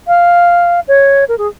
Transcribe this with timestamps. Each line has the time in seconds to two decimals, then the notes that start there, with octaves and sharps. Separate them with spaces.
0.07 F5
0.88 C#5
1.29 A#4
1.38 G#4